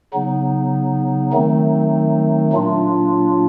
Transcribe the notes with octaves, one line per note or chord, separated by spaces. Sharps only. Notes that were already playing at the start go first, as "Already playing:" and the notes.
C#3 F#3 B3 D#4
D#3 F#3 A3 C4 D#4
A#2 F#3 A#3 D4 F4